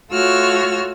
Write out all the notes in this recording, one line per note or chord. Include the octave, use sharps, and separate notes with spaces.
A3 F4 F#4 C#5 E6 F6